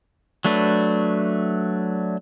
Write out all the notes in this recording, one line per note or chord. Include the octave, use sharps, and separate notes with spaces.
F#3 A3 D4 B4